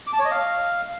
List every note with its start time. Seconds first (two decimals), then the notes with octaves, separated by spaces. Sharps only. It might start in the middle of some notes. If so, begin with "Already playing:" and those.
0.07 D6
0.13 A5
0.19 C#5
0.25 D#5
0.31 F5